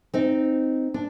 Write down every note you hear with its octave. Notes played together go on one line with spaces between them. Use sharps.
C4 D#4
D4